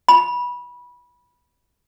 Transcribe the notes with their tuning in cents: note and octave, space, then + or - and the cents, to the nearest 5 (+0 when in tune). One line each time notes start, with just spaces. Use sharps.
B5 -20